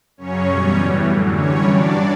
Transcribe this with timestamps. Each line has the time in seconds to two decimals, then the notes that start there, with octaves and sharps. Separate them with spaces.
0.17 F#2 C#3 F#3 C#4 C#5
0.47 E2 B2 G3
0.76 A2 E3 G3
1.06 F#2 D3 F#3
1.35 G2 E3 G3 C#4 C#5
1.65 G2 F#3 D4 D5